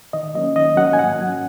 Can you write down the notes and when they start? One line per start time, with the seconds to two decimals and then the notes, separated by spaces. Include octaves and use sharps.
0.13 D#3 D#5
0.35 F#3 A#3 C#4 D#5
0.55 D#3 D#5
0.77 F#3 A#3 C#4 F#5
0.93 G#5
0.99 G#2 F#5
1.21 F#3 C#4